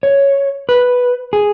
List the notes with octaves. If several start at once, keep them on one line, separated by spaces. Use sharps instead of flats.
C#5
B4
G#4